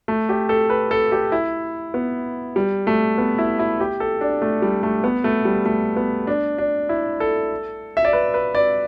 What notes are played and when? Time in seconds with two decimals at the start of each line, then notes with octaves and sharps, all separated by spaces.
0.08 A3
0.29 G4
0.49 A4
0.70 B4
0.91 A4
1.12 G4
1.32 E4
1.94 B3
2.56 G3
2.87 A3
3.18 B3
3.38 E4
3.59 E4
3.80 G4
4.00 A4
4.21 D4
4.42 A3
4.62 G3
4.83 A3
5.04 B3
5.24 A3
5.45 G3
5.65 A3
5.97 B3
6.27 D4
6.58 D4
6.89 E4
7.20 A4
7.97 E5
8.05 D5
8.13 B4
8.34 B4
8.55 D5